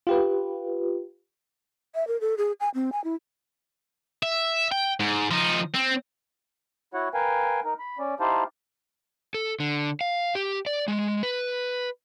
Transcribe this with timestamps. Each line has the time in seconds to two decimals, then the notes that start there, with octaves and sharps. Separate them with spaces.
0.07 F4 G4 B4
1.95 E5
2.08 A#4
2.21 A4
2.38 G#4
2.60 G#5
2.75 C4
2.92 G#5
3.04 E4
4.23 E5
4.72 G5
5.00 G#2
5.31 F3 D#4
5.75 C4
6.94 E4 F#4 C#5 F#5
7.14 A#4 B4 F5 G5 G#5
7.64 D#4 A#4
7.79 B5
7.98 C#4 D5
8.20 D#4 E4 G4 C5 F5 A5
9.34 A4
9.60 D3
10.01 F5
10.35 G4
10.66 D5
10.88 G#3
11.23 B4